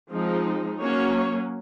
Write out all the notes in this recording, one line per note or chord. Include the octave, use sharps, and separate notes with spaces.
F3 G#3 C4 D#4
F#3 A#3 C#4 C#5